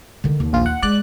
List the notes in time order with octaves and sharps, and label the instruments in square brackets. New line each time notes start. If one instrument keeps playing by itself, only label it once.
[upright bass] D3 D#3
D#2
[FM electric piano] A#1 F4
F#5
[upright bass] G#3 [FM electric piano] D5 F#6